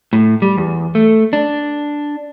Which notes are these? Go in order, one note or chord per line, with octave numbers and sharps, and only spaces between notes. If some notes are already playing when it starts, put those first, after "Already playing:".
A2
G3
E2
A3
D4